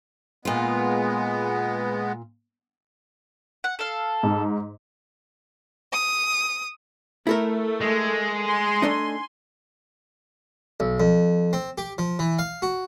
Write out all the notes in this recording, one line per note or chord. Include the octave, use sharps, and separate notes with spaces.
A#2 G#3 B3 F4
F#5
A4 F5
G#2
D#6
A3 E4 A4 A#4
G#3
G#5 C6
A3 D4 D#4
B1
F2
C4
G4
F3
E3
F5
F#4